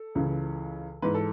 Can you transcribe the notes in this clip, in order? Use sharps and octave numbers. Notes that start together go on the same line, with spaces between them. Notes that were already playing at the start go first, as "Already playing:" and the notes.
Already playing: A4
C#2 C#3 E3
G#2 E3 B4
A4